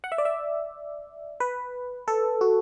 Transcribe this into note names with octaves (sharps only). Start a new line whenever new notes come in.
F#5
E5
D5
E5
B4
A4
F#4